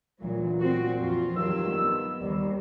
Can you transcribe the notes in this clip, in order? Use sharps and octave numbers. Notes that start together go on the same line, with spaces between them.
D2 A#2 E3 F#3
C4 F#4
F2 E3 F4
G2 D#3 F#3 F4 E6
B3
D#2 G3